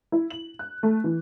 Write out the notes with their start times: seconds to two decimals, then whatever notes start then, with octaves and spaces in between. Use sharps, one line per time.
0.12 E4
0.30 F#7
0.59 F#6
0.83 A3
1.04 E3